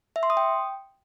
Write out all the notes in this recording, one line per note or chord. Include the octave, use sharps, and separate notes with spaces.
E5
C6
D#6
G5